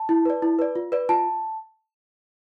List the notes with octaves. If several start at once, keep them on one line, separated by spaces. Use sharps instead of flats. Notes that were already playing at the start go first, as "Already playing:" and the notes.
Already playing: A5
E4
B4 D5
E4
B4 D5
F4
B4 D5
F4 A5